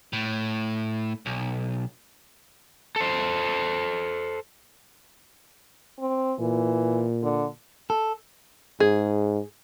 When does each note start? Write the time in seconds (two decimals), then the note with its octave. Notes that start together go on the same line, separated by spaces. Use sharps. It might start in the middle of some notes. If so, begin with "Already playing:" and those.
0.13 A2
1.26 B1
2.96 A4 C5
5.99 C4
6.39 A#2 E3
7.23 D3
7.90 A4
8.80 G#2 G#4